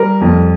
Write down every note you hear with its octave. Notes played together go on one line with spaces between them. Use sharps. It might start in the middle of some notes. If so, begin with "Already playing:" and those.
Already playing: G3 A#4
F2